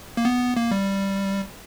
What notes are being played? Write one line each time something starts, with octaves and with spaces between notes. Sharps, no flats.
A#3
B3
A#3
G3